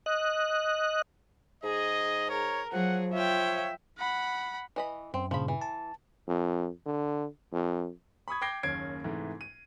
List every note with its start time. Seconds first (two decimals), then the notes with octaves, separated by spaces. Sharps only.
0.06 D#5 F#6
1.64 G#2 G#4 D#5
2.30 A#4 C#5
2.73 F3 F#3 G#4 F#5
3.13 F4 C#5 E5 G5
3.98 F#5 B5
4.76 E3 D#5 B5
5.14 F#2 C4
5.31 G2 A#2 C#3 F3 B5
5.48 E3
5.62 A5
6.28 F2
6.86 D3
7.52 F2
8.28 B5 C#6 D#6 G#6
8.41 G5 D6 G#6 A#6 C7 G7
8.63 F#1 D#2 C#4 G#6 C7 D7
9.04 G#2 C3 E3 A3
9.41 D#7